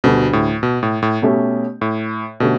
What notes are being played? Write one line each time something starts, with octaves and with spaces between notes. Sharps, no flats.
D2 B2 D3 G3 D4
A2
B2
A2
A2
B2 A3 C#4 G4
A2
B2 D3 A3 C#4 G4